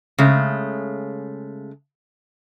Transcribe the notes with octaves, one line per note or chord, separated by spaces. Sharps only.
C#3 G#3 A3